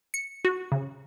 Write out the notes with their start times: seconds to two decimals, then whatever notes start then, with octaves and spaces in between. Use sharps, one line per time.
0.14 C#7
0.45 F#4
0.72 C#3